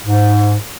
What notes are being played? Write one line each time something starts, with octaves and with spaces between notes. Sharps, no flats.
G#2